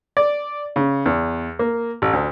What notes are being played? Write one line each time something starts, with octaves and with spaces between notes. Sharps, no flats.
D5
C#3
E2
A#3
A1
D2